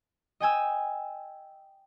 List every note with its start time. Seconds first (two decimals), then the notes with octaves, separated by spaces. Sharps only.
0.40 D#5 G5 G#5 E6